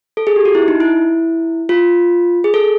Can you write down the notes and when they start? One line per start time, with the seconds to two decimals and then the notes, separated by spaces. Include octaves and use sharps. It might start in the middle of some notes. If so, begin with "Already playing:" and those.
0.17 A4
0.27 G#4
0.36 G4
0.45 F#4
0.55 E4
0.68 D#4
0.80 E4
1.69 F4
2.44 G#4
2.54 A4